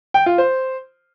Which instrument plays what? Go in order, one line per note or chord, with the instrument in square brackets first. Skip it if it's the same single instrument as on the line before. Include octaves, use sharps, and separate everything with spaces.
[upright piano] G5
F4
C5